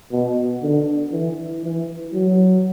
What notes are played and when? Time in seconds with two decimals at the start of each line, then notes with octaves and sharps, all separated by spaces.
0.12 B2
0.62 D3
1.13 E3
1.64 E3
2.14 F#3